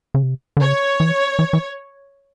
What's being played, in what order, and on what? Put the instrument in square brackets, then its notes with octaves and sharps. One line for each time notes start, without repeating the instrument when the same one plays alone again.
[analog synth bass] C#3
C3
D3
[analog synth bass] C#3 [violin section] C#5
[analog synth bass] E3
E3
E3